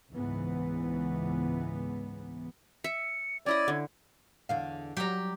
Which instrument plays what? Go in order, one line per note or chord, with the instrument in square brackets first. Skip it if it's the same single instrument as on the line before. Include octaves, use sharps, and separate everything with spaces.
[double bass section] C#2 G#2 E3 B3
[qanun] E5 [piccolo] C#7
[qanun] C#4 E4 D#5 [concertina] D5 [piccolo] G#6
[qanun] D3
[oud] E2 D3 F5
[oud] F#3 G3 [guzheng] G4 A#5